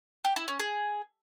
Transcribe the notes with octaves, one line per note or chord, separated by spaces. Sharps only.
G4
E4
C#4
G#4